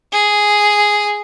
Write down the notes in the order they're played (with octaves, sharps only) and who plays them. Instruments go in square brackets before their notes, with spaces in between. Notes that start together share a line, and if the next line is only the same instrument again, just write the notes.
[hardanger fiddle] G#4